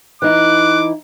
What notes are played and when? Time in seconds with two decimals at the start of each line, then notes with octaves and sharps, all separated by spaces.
0.22 E3 D#4 E4 D6 F#6